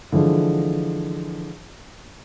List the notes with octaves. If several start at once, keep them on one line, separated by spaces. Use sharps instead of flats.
D3 E3 F3 G#3